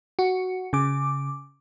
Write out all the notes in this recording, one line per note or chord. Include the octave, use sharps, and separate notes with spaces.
F#4
C#3 D6